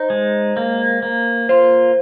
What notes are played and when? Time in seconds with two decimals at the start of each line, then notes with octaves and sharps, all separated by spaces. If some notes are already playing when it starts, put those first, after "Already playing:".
Already playing: D#4 C5
0.10 G#3
0.57 A#3
1.03 A#3
1.49 F4 C5